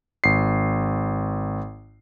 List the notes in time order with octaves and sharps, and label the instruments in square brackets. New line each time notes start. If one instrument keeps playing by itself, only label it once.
[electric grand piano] G#1 C7